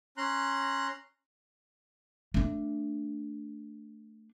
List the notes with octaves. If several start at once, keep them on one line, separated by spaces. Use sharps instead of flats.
C#4 A#5 C6 F#6
A3 D4